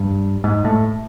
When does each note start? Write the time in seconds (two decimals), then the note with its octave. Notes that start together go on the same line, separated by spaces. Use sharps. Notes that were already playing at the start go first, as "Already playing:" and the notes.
Already playing: G2
0.44 G#2
0.65 A2